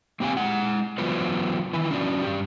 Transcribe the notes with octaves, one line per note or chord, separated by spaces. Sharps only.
A#3 C4 G4 F5 G#5
G#3 F#5
E3 F#3 B3 F4 B4 C5
D#3 E3 E4 B4
C#4 D4 F#4
G2 G4